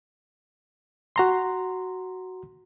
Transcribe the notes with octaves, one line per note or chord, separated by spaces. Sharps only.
F#4 A#5 C6